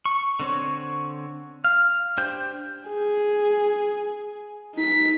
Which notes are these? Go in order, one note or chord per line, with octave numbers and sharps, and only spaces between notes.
C#6
D3 C4 C#5
F5
D4 G4 C5 G5 G6
G#4
D#4 B6